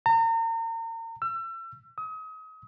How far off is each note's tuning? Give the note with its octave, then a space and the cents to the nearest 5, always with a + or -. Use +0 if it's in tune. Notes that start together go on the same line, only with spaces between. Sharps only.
A#5 -40
E6 +35
D#6 +35